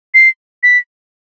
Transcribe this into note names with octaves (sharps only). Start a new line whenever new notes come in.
C7
B6